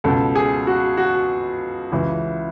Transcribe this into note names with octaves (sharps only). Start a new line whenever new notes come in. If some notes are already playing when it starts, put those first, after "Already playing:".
C#2 B2 A4
G#4
F#4
F#4
C#2 C#3 E3